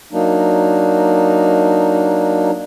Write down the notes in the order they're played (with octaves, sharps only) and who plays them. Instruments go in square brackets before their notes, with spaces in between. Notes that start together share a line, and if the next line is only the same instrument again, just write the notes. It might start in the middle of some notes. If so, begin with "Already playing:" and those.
[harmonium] F#3 A#3 D4 D#4